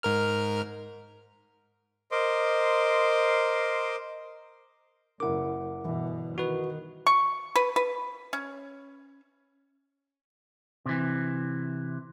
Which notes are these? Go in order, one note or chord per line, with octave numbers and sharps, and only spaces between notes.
G#2 A#4 F6
A#4 C5 D#5 C6 D6
F#1 C#3 E4 A#4 F#5 D6
G1 B2 E3
D#3 F#4 B4
C#6
B4
B4
C#4
C3 E3